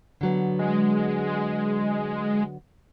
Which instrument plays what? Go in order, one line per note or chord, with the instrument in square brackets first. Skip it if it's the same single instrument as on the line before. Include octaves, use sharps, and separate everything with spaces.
[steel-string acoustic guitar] D3 F#3 B3
[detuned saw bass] G#3